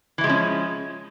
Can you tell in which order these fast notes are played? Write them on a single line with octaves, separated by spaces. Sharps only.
E3 E4 G#3 F3 C#4